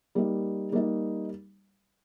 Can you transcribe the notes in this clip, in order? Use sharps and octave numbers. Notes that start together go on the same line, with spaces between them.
G3 A#3 D#4
G3 A#3 D#4